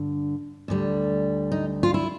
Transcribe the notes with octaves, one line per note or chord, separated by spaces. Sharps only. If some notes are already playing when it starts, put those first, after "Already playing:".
Already playing: G2 D3
D2 D3 G3
D#4
F4
E4